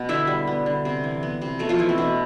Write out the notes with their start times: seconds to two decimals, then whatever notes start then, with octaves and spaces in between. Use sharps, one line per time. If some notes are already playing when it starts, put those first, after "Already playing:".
Already playing: B2 B3
0.09 D3 E4 E5
0.27 G3
0.47 B3
0.66 D3
0.85 C3
1.04 E3
1.23 B3
1.42 C3
1.59 B2 A3 A4
1.69 F3 F4
1.79 E3 A3 E4
1.89 C4
1.98 B2 D4